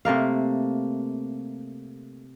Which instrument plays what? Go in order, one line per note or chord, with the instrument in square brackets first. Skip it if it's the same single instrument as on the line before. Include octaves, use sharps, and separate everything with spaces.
[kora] C3 A3 A#3 F5